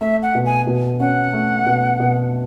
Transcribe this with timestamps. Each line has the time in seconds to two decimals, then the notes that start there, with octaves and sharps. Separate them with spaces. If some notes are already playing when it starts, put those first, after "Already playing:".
0.01 A3 E5
0.22 F#5
0.35 B2
0.46 G#5
0.67 B2
1.00 C#4 F#5
1.33 A3
1.66 B2
2.00 B2